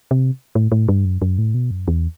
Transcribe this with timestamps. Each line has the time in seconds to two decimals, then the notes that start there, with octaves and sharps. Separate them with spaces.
0.11 C3
0.55 A2
0.72 A2
0.88 G2
1.05 F#2
1.22 F#2
1.38 A2
1.54 B2
1.71 F#2
1.88 E2